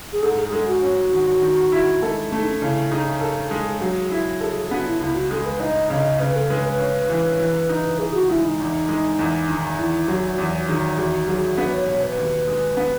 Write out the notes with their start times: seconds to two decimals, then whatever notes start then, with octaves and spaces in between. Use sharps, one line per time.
0.13 G#4
0.23 G#2 A4
0.38 G#4
0.52 G#3 A4
0.67 F#4
0.82 C#4
1.13 D#3
1.42 D#3
1.72 E4
2.02 G#3 A4
2.32 A3 C#4
2.39 D#4
2.47 C#4
2.61 C#3 E4
2.91 D#4 G#4
3.21 A4
3.51 G#3
3.81 F#3
4.11 E4
4.41 G#4 A4
4.56 G#4
4.71 B3 F#4
4.86 E4
5.01 C#2 E4
5.15 F#4
5.31 G#3 A4
5.46 B4
5.60 D#4 D#5
5.90 C#3 D#5
6.20 C#3 B4
6.36 A4
6.50 G#3 B4
6.65 B4
6.79 C#4
7.10 E3
7.40 E3
7.69 D#4
7.99 E3 G#4
8.14 F#4
8.29 G#3 E4
8.44 D#4
8.59 E2
8.89 G#3
9.19 E2
9.49 D#3
9.78 E2 E4
10.08 F#3 F#4
10.38 E2 F#4
10.62 F#4
10.68 D#3 G#4
10.98 E2 F#4
11.28 F#3 G#4
11.58 B3 B4
11.73 C#5
11.88 B2 C#5
12.03 B4
12.18 D#2
12.48 G#3
12.77 B3